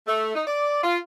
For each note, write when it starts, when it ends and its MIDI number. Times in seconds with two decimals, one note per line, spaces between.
0.08 0.31 57
0.35 0.43 63
0.47 0.79 74
0.83 0.98 65